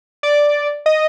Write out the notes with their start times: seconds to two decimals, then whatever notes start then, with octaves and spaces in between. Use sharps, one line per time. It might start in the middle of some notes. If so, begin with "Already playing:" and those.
0.23 D5
0.86 D#5